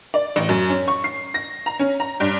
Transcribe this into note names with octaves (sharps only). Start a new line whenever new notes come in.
D5
A1
F#2
C#4
C#6
C7
A#6
A#5
C#4
A#5
G2